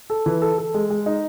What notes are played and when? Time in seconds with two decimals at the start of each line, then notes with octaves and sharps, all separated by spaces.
0.10 A4
0.26 E3
0.42 A4
0.58 A4
0.74 G#3
0.90 G#3
1.06 D#4